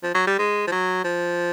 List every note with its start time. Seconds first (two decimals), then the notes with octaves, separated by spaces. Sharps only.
0.03 F3
0.15 F#3
0.27 G3
0.39 G#3
0.67 F3
0.72 F#3
1.04 F3